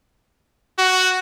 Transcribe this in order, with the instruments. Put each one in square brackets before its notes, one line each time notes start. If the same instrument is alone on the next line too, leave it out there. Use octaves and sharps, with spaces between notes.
[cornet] F#4